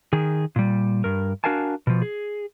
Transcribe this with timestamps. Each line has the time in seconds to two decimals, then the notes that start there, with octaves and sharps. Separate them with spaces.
0.13 D#3 G#4
0.56 A#2 G3
1.04 G2 A#4
1.44 D4 F#4 A#4 F5 G#5 A5
1.87 B2 F3
2.02 G#4